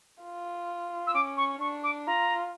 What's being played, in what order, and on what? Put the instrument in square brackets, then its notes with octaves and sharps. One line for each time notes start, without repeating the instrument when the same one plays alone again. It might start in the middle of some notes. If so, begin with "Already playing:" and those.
[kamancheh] F4
[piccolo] E6
[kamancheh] C#4 [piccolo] D6
[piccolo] C#6
[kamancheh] D4 [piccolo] C#6
[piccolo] D6
[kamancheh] F4 [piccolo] A#5